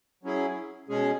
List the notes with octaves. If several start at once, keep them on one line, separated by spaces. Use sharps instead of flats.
F#3 C#4 E4 G#4
B2 G#3 C#4 G#4